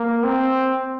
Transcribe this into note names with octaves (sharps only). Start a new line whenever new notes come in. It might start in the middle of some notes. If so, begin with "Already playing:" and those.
Already playing: A#3
C4